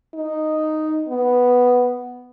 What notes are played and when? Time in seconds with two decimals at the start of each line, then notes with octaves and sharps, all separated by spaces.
0.14 D#4
1.09 B3